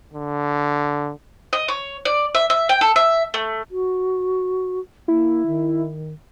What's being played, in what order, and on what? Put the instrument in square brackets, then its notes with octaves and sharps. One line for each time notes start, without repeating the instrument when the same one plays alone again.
[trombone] D3
[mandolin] D#5
C#5
D5
E5
E5
G5
A4
E5
A3
[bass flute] F#4
[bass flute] A#3 [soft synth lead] E4
[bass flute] D#3